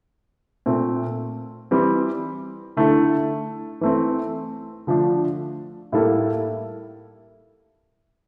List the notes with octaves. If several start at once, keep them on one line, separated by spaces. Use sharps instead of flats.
A#2 A3 C4
E3 G3 C4
D3 A3 E4 A4
E3 A3 C4
D3 F3 A3 D4
A2 G3 A#3 E4 A4